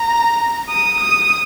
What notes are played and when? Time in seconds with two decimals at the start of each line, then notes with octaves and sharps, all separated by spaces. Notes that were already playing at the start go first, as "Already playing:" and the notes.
Already playing: A#5
0.69 D#6
1.00 D#6